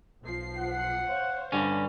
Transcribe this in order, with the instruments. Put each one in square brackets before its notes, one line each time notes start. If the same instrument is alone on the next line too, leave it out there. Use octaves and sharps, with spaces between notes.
[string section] B1 F3 C7
[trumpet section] F#5
[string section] C5 C#5 F5
[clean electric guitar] G2 D3 C#4